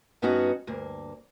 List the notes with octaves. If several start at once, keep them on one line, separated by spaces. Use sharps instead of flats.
G2 B3 C#4 D#4 F#4
D2 G2 A#3